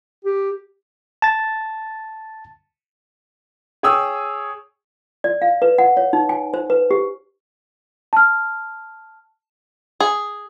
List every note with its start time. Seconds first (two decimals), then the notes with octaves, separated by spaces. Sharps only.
0.25 G4
1.22 A5 A6
3.83 G#4 C#5 G5 D#6 E6
5.24 D5
5.42 F5
5.62 B4
5.78 F#5
5.97 C#5
6.13 D#4
6.29 G#5
6.54 C5
6.70 B4
6.91 G4
8.13 A5 F6
10.00 G#4